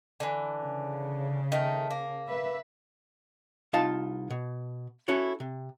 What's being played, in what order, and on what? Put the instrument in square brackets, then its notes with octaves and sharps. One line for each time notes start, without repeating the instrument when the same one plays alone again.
[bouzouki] D3 E3
[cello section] C#3
[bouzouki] D#3 A3
A#3
[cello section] B4 E5
[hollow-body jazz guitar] C2 D#4 F4 F5 A5
B2
C#4 E4 F#4 A4 C#5
C3